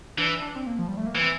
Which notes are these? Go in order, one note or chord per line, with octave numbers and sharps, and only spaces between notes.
E3 D4
D4
C4
A#3
F3
G3
A3
A#3
E3 C4